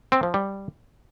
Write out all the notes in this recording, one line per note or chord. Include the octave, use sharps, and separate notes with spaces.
C4
F3
G3